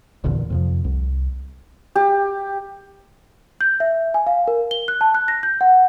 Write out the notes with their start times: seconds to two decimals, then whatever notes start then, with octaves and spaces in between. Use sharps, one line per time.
0.24 D#1 A#1 E2 D3
0.50 F2 C3 F3
0.84 C2
1.95 G4
3.61 G6
3.80 E5
4.14 G#5
4.27 F5
4.48 A#4
4.71 G7
4.88 F#6
5.01 A5
5.15 F#6
5.28 A#6
5.43 G6
5.61 F#5